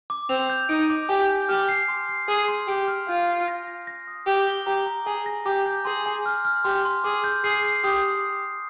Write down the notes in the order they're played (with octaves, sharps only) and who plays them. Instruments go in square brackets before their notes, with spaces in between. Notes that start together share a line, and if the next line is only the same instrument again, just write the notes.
[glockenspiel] D6
[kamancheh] C4 [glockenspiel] F7
[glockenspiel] G6
[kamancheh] D#4 [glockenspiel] D7
[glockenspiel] D6
[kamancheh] G4 [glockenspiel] G#5
[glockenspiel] G6
[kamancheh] G4 [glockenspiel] F6
[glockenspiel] C7
C6
C7
[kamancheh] G#4 [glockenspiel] C7
[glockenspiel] C6
[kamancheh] G4 [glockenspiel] D7
[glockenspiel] F6
[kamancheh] F4 [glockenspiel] G6
[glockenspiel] C7
A#6
A#6
A#6
D#6
[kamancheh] G4 [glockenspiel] D7
[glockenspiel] G7
[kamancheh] G4 [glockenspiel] A#5
[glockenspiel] A#5
[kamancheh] G#4 [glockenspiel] G#5
[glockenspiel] A#6
[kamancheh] G4 [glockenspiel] D6
[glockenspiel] G6
[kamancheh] G#4 [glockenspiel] C6
[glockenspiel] G#5
F6
F6
[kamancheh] G4 [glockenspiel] C6
[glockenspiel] C6
[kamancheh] G#4 [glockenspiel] D6
[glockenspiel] G6
[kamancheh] G#4 [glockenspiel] C7
[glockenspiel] C7
[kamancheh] G4 [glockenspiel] D#6